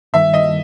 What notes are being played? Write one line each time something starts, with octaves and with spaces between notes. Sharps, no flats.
G2 D#3 G3 E5
D#5